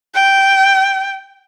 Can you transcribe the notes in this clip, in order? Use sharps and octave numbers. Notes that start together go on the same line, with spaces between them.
G5